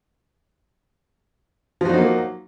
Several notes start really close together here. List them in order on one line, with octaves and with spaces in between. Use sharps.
F3 F#4 D#4 F#3 A#3